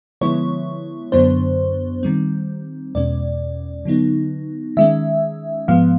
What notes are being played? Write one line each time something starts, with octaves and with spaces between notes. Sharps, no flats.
D3 F3 G#3 B3 E4 C#5
F#2 D3 F#3 B3 D4 C5
D#3 G3 C4
E2 B2 G#3 C#4 D5
D3 F#3 B3 D#4
D#3 G#3 C#4 E5
G#2 F3 G#3 B3 F5